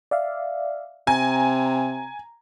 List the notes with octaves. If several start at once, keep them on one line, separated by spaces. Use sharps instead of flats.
D5 E5 F5
C3 G#5 A#5